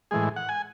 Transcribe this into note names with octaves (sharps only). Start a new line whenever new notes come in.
A2 E3 G#3 G#4
F#5
G#5